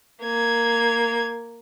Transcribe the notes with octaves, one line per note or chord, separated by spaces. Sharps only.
A#3 G#6